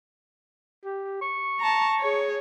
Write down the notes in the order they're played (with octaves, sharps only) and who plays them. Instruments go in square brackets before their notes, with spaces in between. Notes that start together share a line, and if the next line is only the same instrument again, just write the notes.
[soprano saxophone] G4
C#6
[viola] A5 A#5
G#4 C#5